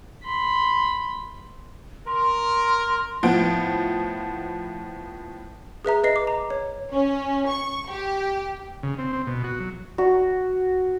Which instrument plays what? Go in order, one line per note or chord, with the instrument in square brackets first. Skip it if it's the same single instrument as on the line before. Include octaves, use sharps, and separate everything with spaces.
[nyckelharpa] B5 C6
[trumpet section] A#4 [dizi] C6
[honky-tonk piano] A2 F3 B3 D7
[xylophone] G#4 B4 E5 A#5
B4 D#5 C7
D6
A#5
C#5
[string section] C#4
C#6
G4
[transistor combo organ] C#3
C4
C4
B2
F#4
F#3
[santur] F#4